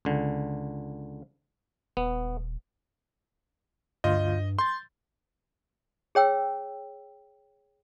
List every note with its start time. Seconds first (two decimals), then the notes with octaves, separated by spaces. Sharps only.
0.05 C#2 D3
1.97 D#1 B3
4.04 D2 G2 F4 D#5 G6
4.59 C6 G6 A6
6.15 G#4 C#5 G5 E6